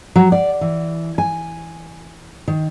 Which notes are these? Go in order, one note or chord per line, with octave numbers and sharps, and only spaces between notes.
F#3
D5
E3
G#5
D#3